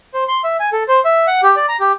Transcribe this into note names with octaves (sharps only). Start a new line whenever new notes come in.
C5
C6
E5
G#5
A4
C5
E5
F#5
G4
D5
A#5
G4